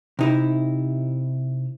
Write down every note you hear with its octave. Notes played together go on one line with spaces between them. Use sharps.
C3 D#4 E4